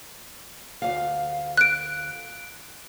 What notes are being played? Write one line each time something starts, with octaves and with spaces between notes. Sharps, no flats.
D2 E3 F5
F#6 D7